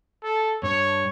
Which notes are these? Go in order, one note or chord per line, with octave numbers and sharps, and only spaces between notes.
A4
G2 C#5